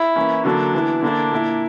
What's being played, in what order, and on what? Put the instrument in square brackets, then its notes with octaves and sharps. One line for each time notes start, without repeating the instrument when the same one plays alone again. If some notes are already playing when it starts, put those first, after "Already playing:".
Already playing: [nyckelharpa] E4
[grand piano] E3 A#3 C#4
[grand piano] D3 F#3 A#3 [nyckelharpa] D4
[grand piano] E3 B3 E4
[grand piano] D3 A#3 E4 [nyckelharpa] D4
[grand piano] A#2 A#3 E4